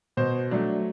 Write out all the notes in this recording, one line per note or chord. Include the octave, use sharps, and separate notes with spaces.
B2 C5
F#3 A3 D4